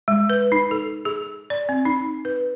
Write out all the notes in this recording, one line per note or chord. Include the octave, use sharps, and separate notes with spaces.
G#3
B4
D#4
A4
G#4
D5
C4
D#4
B4